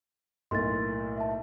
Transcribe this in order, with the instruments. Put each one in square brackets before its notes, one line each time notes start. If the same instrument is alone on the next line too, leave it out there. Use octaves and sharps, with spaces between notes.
[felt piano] B1 A2 A#3 [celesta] C6 A6
[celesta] E5 A5